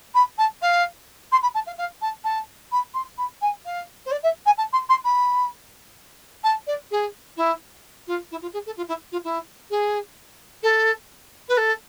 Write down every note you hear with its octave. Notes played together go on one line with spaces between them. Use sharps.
B5
A5
F5
C6
B5
A5
F5
F5
A5
A5
B5
C6
B5
G#5
F5
C5
D5
E5
G#5
A5
C6
C6
B5
A5
D5
G#4
E4
F4
E4
F4
G#4
A4
F4
E4
F4
E4
G#4
A4
B4
A4